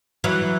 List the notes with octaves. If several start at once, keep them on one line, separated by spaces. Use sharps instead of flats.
E3 F#3